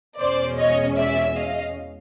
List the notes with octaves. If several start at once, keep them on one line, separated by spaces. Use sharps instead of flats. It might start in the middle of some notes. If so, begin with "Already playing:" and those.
E2 B2 G#3 C#4 C5 D5
C#5 D#5
D5 E5
D#5 F5